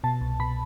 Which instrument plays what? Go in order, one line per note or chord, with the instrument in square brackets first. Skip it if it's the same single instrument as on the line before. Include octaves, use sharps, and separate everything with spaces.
[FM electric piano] B2 A5
C2
B2 B5